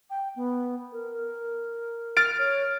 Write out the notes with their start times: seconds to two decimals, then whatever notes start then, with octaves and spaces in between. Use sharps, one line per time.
0.10 G5
0.36 B3
0.92 A#4
2.17 F6 A6 D7
2.38 C#5